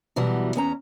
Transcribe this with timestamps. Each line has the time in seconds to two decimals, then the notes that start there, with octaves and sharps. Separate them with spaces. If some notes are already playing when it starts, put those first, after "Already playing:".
0.16 B2 E3 F#3 G3
0.55 E2 C#4 A#5